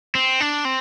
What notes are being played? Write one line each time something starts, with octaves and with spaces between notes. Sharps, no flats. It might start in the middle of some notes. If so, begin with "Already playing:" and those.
C4
D4
C4